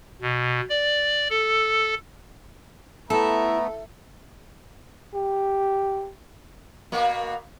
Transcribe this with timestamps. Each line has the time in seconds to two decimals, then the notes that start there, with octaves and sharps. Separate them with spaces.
0.22 B2
0.69 D5
1.30 A4
3.10 A3 B3 E4 A4 A#5
5.14 G4
6.92 B2 A#3 F#4